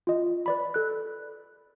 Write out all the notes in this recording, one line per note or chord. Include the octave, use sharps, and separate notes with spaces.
F4 D#5
B4 D5 B5
A4 F#6